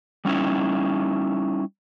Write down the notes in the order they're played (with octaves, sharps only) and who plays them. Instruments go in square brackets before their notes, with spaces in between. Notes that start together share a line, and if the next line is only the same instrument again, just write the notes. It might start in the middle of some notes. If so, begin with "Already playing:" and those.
[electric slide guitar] G3 C#4 D#4 E4